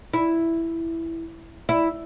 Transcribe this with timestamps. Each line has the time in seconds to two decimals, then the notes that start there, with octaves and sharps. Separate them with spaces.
0.14 E4
1.69 E4